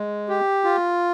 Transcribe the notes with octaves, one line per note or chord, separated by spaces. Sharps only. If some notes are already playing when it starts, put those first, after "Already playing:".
Already playing: G#3
G4
F4